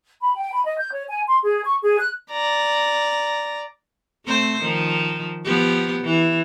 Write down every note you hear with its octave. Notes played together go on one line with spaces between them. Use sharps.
B5
G5
B5
D#5
G6
C#5
G#5
C6
G#4
C#6
G#4
F#6
D5 A#5
A3 C4 C5
D#3 F3
F3 B3 G4
E3